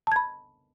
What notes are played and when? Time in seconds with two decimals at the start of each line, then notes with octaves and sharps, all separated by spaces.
0.07 A5
0.12 G#6
0.16 B5